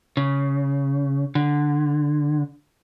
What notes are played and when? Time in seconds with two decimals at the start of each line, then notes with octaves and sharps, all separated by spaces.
0.17 C#3
1.35 D3